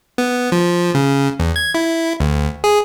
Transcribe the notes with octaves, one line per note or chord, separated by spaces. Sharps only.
B3
F3
C#3
E2
G#6
E4
D2
G#4